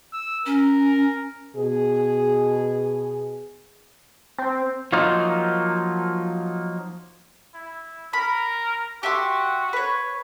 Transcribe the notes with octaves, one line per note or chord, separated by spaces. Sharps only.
E6
C#4 A#4
B2 G#4
C4
F3 F#3 A#3 D#4 F4
E4
A#4 B5
F#4 G4 E5 C6
B4 C#5